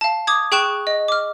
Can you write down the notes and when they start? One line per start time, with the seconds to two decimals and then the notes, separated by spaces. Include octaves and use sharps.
0.01 F5 A5
0.27 D6 D#6 G#6
0.52 G#4 G5 C#6 F#6 E7
0.87 D#5
1.08 D6 F6